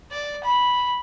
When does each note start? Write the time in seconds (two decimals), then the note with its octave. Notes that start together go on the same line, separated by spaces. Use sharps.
0.11 D5
0.44 B5